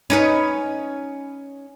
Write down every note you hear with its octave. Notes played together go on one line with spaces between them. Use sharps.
C#4 D#4 B4